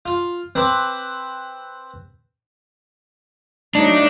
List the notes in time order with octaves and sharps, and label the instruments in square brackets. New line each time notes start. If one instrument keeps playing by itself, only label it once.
[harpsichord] F4
C4 B4 A5 D6
[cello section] F#3 A3 D#4 [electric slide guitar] D4